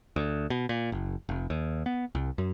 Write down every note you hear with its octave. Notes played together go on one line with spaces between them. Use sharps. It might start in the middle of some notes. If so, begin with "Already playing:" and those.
D2
B2
A#2
F#1
F1
D#2
B3
C2
F#2